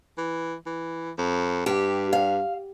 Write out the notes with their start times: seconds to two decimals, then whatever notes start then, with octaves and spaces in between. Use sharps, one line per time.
0.18 E3
0.66 E3
1.18 F2
1.66 G2 G4
2.13 F5